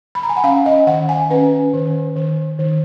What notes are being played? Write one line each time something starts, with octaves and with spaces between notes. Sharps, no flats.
B5
A#5
G#5
F#5
C#4 F5
D#5
D#3 F#5
G#5
C#4 B4
D#3
D#3
D#3